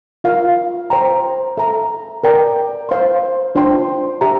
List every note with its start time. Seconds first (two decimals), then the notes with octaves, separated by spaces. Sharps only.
0.24 F4 A#4 F5
0.90 C5 G5 A#5
1.57 A4 E5 A#5
2.24 A#4 D5 G5 A#5
2.89 C5 F5 C6
3.55 D4 F4 C5 G5 C6
4.21 G4 C5 E5 A#5